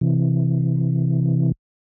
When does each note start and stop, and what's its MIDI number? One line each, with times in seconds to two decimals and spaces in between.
0.01 1.52 48
0.01 1.52 52